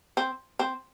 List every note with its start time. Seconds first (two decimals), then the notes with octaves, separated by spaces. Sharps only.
0.17 C4
0.59 C4